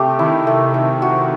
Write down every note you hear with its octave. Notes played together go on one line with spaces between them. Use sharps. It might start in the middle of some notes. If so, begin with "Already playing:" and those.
Already playing: C3 A3 G4
D#3 E4
A3
A3
F#4